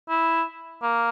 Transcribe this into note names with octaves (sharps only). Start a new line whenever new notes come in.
E4
A#3